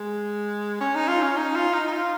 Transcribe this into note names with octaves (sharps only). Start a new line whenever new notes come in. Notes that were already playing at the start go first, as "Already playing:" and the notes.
Already playing: G#3
C#4
D#4
F4
C#4
D#4
F4
D#4
D#4
F4